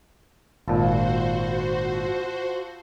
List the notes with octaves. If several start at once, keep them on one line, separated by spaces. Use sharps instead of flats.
G#1 A#2 F3 F#4 A4 C5 B5